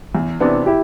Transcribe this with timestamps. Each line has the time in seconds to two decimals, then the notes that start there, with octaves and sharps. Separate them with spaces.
0.15 E2
0.40 C3 E3 B3 D4
0.66 E4 G4